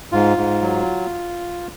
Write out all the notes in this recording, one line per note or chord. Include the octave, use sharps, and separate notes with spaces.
G#2 F4
G#2
F#3